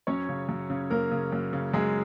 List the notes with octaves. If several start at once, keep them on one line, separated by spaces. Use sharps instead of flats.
F#2 C#4 C#5
C#3
F#2
C#3
F#2 A#3 A#4
C#3
F#2
C#3
F#2 G#3 G#4